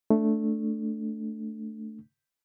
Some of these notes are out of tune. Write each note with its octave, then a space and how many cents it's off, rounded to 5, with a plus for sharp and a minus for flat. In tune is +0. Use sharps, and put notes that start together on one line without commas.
A3 +0 D4 +0